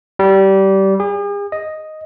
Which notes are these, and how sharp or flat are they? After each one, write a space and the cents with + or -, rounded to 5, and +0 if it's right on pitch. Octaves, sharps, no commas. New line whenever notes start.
G3 -20
G#4 -45
D#5 +0